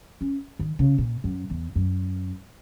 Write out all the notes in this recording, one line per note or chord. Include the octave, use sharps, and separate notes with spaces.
C#4
D#3
C#3
A#2
F#2
E2
F#2